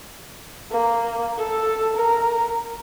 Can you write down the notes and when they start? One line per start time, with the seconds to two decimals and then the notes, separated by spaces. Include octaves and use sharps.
0.71 A#3
1.38 A4
1.96 A#4